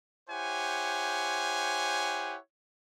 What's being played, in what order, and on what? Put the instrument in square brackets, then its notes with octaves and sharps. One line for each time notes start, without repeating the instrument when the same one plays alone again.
[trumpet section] E4 G4 C5 C#5 F#5 G#5